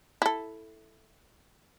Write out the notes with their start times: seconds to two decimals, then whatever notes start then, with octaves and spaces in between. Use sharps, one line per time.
0.22 E4 A4